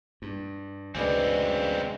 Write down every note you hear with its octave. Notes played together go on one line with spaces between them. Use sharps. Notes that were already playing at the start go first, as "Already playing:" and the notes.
G2
D2 C#3 G#3 C4 B4 D5 G#5